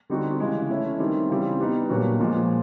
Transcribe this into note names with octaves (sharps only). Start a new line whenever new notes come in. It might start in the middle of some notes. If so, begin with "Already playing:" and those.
D3 G3 C4 D#4 F#4
C#3 E3 G#3
E3 A3 C#4 E4
D#3 G3 C4
C#3 E3 G3 C4
G3 B3 D#4
A#2 F#3 B3 D4 F#4
A#2 F3 G#3